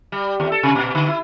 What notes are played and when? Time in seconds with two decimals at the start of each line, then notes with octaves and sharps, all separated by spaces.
0.12 G3
0.40 D#2
0.52 A4
0.63 C3
0.75 A#2
0.95 D3
1.08 E4